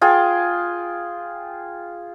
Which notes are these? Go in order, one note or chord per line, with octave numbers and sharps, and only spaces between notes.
F4 G#4 G5